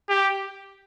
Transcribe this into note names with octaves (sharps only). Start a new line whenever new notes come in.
G4